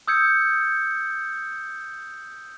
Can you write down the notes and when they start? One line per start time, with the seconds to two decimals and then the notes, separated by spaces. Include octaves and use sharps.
0.07 D#6 E6 G6 G#6 C#7